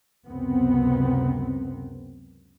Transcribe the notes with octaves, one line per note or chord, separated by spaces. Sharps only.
C#2 F#2 C3 B3 C4